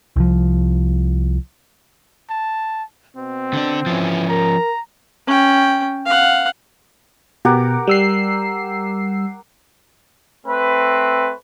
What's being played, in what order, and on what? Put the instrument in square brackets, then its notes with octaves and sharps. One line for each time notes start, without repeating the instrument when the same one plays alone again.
[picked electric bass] C2 F3
[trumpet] A5
[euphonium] B2 [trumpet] C4
[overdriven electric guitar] D3 D4
[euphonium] E3 [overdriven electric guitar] F3 C#4
[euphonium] A#4 [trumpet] A#5
[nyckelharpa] C#4 G5
F5 F#5
[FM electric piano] B2 [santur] G4 A#4 F#5
[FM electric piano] G3 E6 C7
[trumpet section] A3 C4 B4